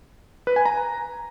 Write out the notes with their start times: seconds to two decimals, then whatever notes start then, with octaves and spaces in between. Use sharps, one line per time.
0.47 B4
0.56 G#5
0.66 A#5